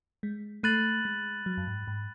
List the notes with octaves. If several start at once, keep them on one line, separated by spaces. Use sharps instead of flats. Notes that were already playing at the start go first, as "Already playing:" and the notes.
G#3
A3 B5 F#6 A6 D#7 F#7
G#3
F#3
F#2
G#2
G#2